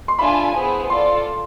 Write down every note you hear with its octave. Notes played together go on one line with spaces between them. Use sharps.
C6
D4 F4 A4 E5 G#5 B5
B3 E4 G#4 C5
F4 A4 D5 C6